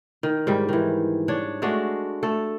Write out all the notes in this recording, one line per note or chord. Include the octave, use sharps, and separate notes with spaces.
D#3
G#2 G3
D#3 E3
D4 C#5
G#3 A3 D4 F#4
A3 A4